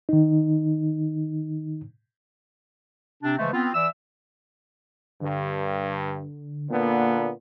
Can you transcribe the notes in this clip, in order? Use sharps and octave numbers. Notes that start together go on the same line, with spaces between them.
D#3 D#4
C3 C4 D4
C#3 E3 F3 G#3 A3
B3 C4 F4
E3 D5 E5 E6
G2 D3
A#2 D3 A#3 B3